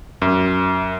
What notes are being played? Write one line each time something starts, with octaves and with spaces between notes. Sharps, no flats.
F#2